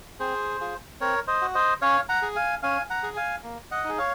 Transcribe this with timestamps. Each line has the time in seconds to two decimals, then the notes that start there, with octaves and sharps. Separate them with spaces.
0.20 C4 G#4 C5
0.61 F4 G#4
1.00 C4 A#4 C#5
1.27 C5 D#5
1.42 F#4
1.55 C5 D#5
1.82 C#4 C#5 F5
2.09 F#5 A#5
2.22 G#4
2.36 F5 G#5
2.63 C#4 F5 G#5
2.90 F#5 A#5
3.03 G#4
3.17 F5 G#5
3.44 A#3
3.71 D#5 F#5
3.84 D#4 G#4
3.98 C#5 F5